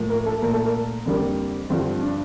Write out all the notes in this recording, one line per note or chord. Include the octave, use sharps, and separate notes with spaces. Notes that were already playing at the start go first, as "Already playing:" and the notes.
Already playing: A2 F3 A#3
A#4
A4
A#2 A3 A#4
A4
A#4
F2 D3 G3 A#3
G2 D3 F3 C4
D4